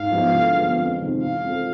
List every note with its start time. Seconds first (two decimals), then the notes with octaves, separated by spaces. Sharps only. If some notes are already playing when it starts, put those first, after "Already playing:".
Already playing: G#2 F5
0.10 F3 G#3 B3 E4
0.33 D3
0.55 F3 G#3 B3
0.77 F2
1.00 C3 D#3 G#3 C4
1.22 E3 F5
1.44 G#3 C4 F4 A4